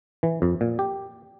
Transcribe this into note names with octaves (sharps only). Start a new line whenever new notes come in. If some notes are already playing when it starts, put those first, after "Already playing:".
E3
F2
A#2
G4